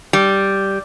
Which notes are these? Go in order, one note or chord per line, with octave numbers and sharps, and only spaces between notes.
G3